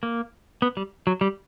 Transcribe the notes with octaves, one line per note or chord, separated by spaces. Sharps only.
A#3
B3
G3
F#3
G3